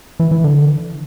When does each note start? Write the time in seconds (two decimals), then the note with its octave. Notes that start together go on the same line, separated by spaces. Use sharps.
0.20 E3
0.31 E3
0.44 D3